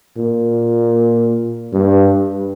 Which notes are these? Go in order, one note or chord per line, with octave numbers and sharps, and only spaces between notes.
A#2
G2